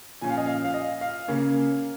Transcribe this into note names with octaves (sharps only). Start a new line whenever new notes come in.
A#2 F3 C#4 G#5
F5
D#5
F5
F5
D#5
F5
C#3 A#3 C#4